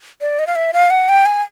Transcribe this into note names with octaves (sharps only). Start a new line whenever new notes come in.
D5
D#5
F5
E5
F5
F#5
G5
G#5